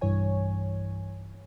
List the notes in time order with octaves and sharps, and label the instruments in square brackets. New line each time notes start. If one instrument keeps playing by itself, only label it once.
[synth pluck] B1 G2 E3 C#5 G#5